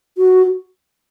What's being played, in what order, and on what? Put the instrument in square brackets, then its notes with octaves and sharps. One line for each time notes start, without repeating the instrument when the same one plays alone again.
[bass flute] F#4